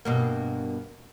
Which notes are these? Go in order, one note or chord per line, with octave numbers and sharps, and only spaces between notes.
G2 B2 A#3